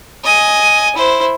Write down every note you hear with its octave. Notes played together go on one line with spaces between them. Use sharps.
D#5 G#5
E4 C5